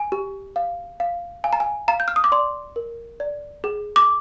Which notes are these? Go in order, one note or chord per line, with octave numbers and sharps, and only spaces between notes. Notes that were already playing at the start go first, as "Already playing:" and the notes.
Already playing: G#5
G4
F5
F5
F5 G#5
A#5
G#5
F5 A#5
G6
F6
D#6
D6
D5 C6
A#4
D5
G#4
D6